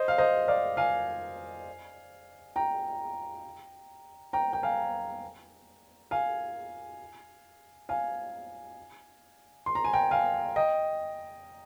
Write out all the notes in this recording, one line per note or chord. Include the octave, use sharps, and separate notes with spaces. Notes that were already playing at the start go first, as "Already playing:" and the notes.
Already playing: C5 D#5
F5
C5 D#5
D5 F5
F5 G#5
G5 A#5
G5 A#5
G5
F5 G#5
F5 G#5
F5 G#5
C6
A#5
G#5
G5 A#5
F5 G#5
D#5 G5